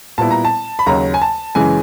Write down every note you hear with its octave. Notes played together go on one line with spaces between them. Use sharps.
A#2 G3 B3 E4 A5
A#5
A5
B5
D#2 C#3 F#3 A#5
G#5
A5
F#2 C#3 E3 G#3 C#4 G#5